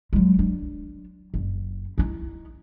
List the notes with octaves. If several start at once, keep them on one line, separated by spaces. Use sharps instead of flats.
F#3 G#3
D4
F#1
D#4 E4